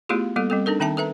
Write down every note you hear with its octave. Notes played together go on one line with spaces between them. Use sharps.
A3 B3 E4 F4 G4 G#4
G3 A#3 B3 A4
G3 C4 A4
D4 D#4 A4 A#4
D#3 C4 D#4 E5 G5 A5
A4 B4 E5 A#5